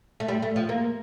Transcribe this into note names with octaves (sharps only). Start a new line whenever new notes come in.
A3
G3
A3
F3
A#3